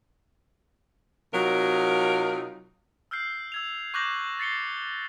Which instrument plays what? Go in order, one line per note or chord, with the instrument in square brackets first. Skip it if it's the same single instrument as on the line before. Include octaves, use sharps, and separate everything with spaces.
[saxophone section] C3 F#3 D#4 F4 A#4
[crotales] E6 F6 G6 C7
E6 G#6 F7
C#6 D6 F#6 G6 A#6 F#7
A6 C7 C#7 G7